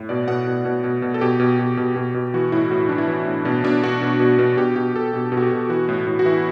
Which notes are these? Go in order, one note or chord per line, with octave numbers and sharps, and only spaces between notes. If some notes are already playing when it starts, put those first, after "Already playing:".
Already playing: A2
B2 D5
B2 F#5
B2
B2
B2
B2
A4
B2 G4
B2
B2
B2
B2
B2
E3 F#4
A2 E4
A2 F#4
E4
E3 D4
E4
E3
A2
B2 D4
B2 D4
B2 F#4
B2
B2
B2
B2 G4
B2 G4
B2 A4
B2
B2
F#4
G4
B2
E3 F#4
A2
A2
F#4
E3 E4